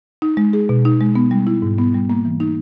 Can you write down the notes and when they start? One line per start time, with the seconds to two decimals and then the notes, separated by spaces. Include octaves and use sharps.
0.22 D#4
0.37 G#3
0.53 G#4
0.69 B2
0.85 D#4
1.01 G#3
1.15 B3
1.31 G3
1.47 E4
1.62 G#2
1.78 B3
1.94 G3
2.10 A#3
2.25 E3
2.40 D#4